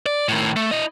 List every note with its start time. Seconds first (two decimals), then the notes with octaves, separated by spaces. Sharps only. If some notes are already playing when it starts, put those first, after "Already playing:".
0.06 D5
0.28 A2 D#3
0.56 A3
0.71 E4 D#5